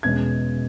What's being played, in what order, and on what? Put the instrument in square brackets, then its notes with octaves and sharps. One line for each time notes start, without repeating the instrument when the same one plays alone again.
[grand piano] E2 B2 G#3 C#4 G#6